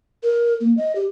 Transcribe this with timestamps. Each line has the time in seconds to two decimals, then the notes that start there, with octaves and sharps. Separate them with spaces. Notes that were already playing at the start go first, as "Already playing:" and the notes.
0.23 A#4
0.60 A#3
0.77 D#5
0.96 G4